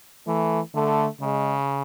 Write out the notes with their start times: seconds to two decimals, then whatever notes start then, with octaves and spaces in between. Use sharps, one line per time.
0.27 E3 A3
0.75 D3 A3
1.21 C#3 G#3